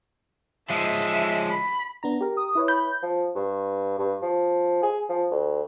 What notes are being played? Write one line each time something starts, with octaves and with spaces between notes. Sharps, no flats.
F3 G#3 E5
B5
B3 D4 A#5
G4 A#4
D#6
E4 B4 C#5
B5 G6
F3
G2
G2
F3
G#4
F3
D2